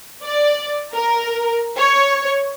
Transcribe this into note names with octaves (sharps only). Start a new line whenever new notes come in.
D5
A#4
C#5